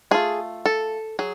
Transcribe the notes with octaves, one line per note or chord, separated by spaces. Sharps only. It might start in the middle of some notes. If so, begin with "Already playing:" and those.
A3 F4 G#4
A4
F#3 G#4